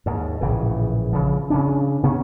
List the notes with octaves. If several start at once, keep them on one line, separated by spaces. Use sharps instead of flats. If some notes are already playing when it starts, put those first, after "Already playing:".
D#2 G#2
A#1 A2 C#3 E3
C#3 F3
C#3 C#4 D4
C3 D#3 B3 C#4